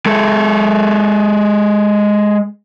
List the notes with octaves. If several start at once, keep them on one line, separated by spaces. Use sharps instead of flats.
G#3 A4